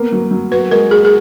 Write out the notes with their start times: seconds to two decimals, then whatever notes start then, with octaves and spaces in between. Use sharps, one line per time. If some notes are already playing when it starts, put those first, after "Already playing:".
Already playing: A#3 B3
0.12 F#3
0.31 F#3
0.51 F#4 B4
0.71 G#3 A#4
0.91 F#4 G#4
1.05 G#4